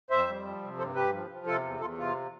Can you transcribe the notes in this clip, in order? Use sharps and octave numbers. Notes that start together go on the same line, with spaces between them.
F2 C5 E5
G3
F3
C3
G2 A4 C5
G2 G4 B4
F3
F3
C3 F4 A4
E2
E2 F4 A4
C3 F4